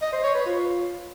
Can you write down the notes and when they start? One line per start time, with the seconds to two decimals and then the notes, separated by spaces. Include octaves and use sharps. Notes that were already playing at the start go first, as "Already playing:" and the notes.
0.02 D#5
0.13 C5
0.24 C#5
0.35 B4
0.46 F4